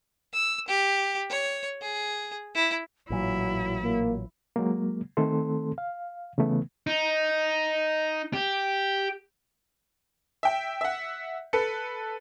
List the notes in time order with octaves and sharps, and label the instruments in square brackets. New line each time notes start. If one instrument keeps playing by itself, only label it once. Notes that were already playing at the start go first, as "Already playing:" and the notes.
[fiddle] E6
G4
C#5
G#4
E4
[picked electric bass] A1 A#2 [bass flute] F#3 [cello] E4
[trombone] A#3
[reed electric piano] F#3 G#3 A#3
D#3 A3 C4 A4 C6
F5
C#3 E3 A3 B3
[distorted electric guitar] D#4
G4
[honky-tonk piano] E5 G5
E5 F#5
A4 B4 C#7